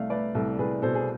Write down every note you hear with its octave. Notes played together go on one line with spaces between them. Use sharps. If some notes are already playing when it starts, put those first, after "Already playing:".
Already playing: C2 A3 D5 F5
A3 B4 D5
C2 A4
C2 G#4 B4
B2 A4 C5
G#4